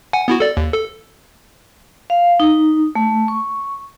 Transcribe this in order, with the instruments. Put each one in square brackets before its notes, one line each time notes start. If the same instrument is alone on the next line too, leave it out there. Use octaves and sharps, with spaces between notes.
[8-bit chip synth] F#5 G#5
B3 E4 F#4
A4 D5
D#2
A4
[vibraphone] F5
D#4
A3
C#6